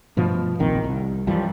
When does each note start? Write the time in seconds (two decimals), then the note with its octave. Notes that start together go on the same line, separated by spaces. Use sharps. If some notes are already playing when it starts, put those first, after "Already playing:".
0.17 G2 B2 F3 A3
0.59 F1 A#1 D#3 C4
0.84 C2
1.27 F#2 E3 F3 G3